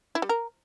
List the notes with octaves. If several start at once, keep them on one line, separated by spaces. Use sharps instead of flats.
E4
G3
A#4